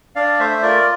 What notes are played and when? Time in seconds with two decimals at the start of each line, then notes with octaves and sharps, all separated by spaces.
0.16 D4 D5 F5
0.39 A3 C5 E5
0.51 E5
0.62 F4 A#4 D5